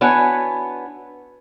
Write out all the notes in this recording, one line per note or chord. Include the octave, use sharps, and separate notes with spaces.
B3 D4 E4 F#4 C#5 G#5